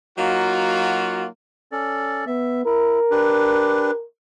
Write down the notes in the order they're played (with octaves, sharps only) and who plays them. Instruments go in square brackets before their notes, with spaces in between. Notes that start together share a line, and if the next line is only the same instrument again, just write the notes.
[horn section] F#3 A#3 D#4 F4 F#4
[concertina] C#4 A4 D5
[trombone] B3 [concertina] E5
[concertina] E4 [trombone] A#4
[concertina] D4 G4 B4